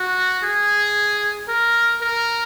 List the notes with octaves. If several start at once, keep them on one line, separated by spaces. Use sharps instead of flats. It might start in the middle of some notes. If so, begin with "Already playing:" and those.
Already playing: F#4
G#4
A#4
A#4